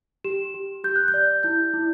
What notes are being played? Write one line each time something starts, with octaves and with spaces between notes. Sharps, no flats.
G4 E7
G4
G4 G6
F#6
G6
D5
E4 G6
E4